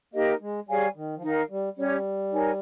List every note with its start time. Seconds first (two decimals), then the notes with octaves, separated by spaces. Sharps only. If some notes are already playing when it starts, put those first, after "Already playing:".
0.14 A#3 D#4 G4 A#4 D#5
0.41 G#3
0.68 G3 G#4 C#5 F5 G#5
0.96 D#3
1.16 F3
1.22 D#3 D#4 A#4 F5
1.50 G3
1.77 G3 C#4 G4 C#5
2.32 D#4 A#4 C#5 G#5